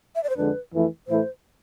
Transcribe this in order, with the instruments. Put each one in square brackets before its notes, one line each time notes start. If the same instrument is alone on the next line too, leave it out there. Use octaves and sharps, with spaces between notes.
[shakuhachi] E5
D5
C5
[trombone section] F2 D3 G#3 D4 [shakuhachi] B4
[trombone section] F2 E3 A3 E4
[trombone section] A2 E3 A3 E4 [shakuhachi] C5